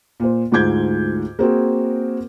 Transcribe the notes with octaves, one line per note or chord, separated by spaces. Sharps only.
A#2 C5
D2 G#2 F4 D6 G6 G#6
A#3 C4 F#4 G#4